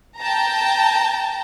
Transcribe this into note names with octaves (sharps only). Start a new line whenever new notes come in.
G5 A5 A#5